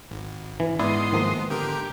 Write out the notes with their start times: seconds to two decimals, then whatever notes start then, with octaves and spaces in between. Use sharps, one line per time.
0.11 G#1
0.60 E3
0.79 G#2 B3 E4 D5 C6 D#6
1.12 D#3 F3 A#3
1.50 D3 G4 A#4